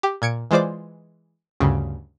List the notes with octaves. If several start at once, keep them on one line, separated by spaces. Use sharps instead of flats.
G4
A#2 G#6 C#7 D7
E3 G#3 F4 C5 D5 D6
D2 G2 C#3